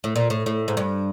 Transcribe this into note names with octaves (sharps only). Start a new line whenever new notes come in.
A2
A#2
A2
A2
G#2
G2